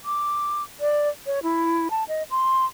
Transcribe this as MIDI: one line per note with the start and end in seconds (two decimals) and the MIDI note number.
0.05 0.63 86
0.80 1.08 74
1.26 1.40 73
1.43 1.88 64
1.91 2.04 81
2.08 2.23 75
2.30 2.65 84